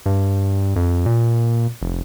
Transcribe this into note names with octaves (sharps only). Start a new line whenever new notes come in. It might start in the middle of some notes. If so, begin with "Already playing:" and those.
G2
F2
A#2
F1